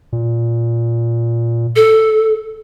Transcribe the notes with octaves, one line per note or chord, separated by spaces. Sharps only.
A#2
A4